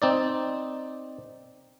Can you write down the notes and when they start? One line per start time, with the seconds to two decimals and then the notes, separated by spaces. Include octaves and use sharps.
0.02 C4 D#4 D5